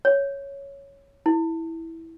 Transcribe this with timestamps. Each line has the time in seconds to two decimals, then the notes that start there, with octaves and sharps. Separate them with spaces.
0.05 C#5
1.26 E4